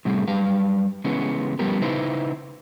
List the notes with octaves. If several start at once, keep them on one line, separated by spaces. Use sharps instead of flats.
A2 C3 G3 C4 G#4
F#2 G3 B4 F5
C#3 E3 G#3 B3 C#4
F3 G3 B3 C#4 G4 A#4
C#3 D#4 E4 B4 C5